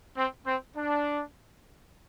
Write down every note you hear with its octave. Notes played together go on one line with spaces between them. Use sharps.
C4
C4
D4